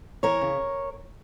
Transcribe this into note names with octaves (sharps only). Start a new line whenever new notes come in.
E3 A#4 C#5
C#3